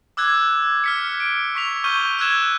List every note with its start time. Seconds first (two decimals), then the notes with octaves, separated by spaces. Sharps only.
0.17 D6 E6 F#6 G#6
0.84 F6 B6 C#7
1.20 D7
1.55 C#6 B6 F7
1.84 C#6 F6 G6 D#7 G7
2.19 E6 F#6 G#6 E7